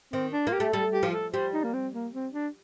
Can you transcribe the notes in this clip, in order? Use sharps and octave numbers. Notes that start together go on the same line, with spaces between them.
D#3 C4
D4
A#3 F4
G4
A3
G3 A4
G4
F3
A4
G3 C5
D#4
A#3
C4
A#3
C4
D4